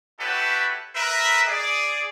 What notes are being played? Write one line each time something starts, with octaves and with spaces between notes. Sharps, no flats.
E4 F#4 G4 A4 B4 C#5
A#4 B4 E5
G#4 D5